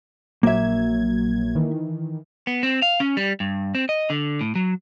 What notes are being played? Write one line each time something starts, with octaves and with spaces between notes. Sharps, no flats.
A#1 F#3 A#3 E5 G#6
D#3 E3
B3
C4
F5
C#4
G3
G2
C4
D#5
D3
A2
F#3